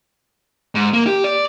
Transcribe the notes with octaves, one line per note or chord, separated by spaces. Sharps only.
G#2
A#3
G4
D5